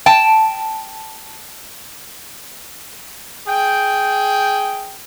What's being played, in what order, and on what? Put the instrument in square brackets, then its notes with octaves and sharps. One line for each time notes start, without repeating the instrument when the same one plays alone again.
[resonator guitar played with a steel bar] G5 A5
[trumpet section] G#4 G5